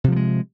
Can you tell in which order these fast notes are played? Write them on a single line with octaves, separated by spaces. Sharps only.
C3 F3 G3 G#3